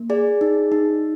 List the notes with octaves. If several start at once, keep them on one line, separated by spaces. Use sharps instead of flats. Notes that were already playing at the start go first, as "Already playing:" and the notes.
Already playing: A#3
G#4 D5
D#4
D#4